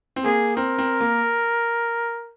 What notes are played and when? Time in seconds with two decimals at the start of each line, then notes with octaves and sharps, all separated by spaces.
0.16 C4
0.24 A#3 G#4
0.57 C4 A#4
0.78 C4
1.00 A#3